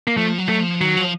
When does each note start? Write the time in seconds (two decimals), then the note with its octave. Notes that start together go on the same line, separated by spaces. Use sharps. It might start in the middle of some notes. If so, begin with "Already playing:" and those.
0.07 A#3
0.17 F3 A3
0.38 F#3
0.49 A3
0.60 F3
0.81 D#3 F#3
0.97 F3